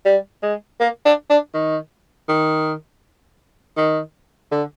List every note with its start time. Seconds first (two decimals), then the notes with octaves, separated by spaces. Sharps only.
0.05 G3
0.43 G#3
0.80 A#3
1.05 D4
1.30 D4
1.54 D#3
2.29 D#3
3.77 D#3
4.52 D3